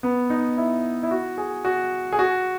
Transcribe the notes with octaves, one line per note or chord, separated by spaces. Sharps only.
B3
D#4
E4
E4
F#4
G#4
F#4
G#4
F#4